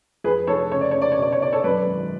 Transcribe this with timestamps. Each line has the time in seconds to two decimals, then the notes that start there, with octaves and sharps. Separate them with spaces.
0.24 F2 G#4 B4
0.47 F1 A4 C#5
0.71 C#3 C#5
0.81 D5
0.91 C#3 C#5
1.01 D5
1.12 C#5
1.18 B2 D5
1.32 C#5
1.41 B2 D5
1.53 A4 C#5
1.64 F#2 B4 D5
1.87 G#1